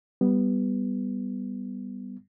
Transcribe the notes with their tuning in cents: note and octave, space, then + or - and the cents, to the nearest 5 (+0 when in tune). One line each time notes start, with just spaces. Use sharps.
G3 +0 B3 +0